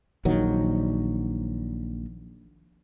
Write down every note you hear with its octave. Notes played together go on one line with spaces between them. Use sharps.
A#1 D#3 F#3